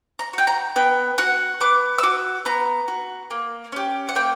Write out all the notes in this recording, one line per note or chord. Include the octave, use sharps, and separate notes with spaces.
A#5
F#4 G5
A#5
B3 G5
F#4 F#5
B3 D6
E6
F#4 D6
B3 A#5
F#4
A#3
C#4 G4
F#5
A#3 G5